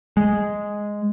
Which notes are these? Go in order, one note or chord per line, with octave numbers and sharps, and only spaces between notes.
G#3